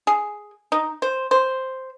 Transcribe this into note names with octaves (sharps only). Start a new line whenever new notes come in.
G#4
D#4
C5
C5